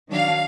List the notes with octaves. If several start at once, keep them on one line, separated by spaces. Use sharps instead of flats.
D#3 F#3 D4 F5